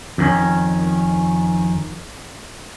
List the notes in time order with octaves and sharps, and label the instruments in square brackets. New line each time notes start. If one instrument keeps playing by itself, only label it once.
[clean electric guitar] F2 D#3 C#4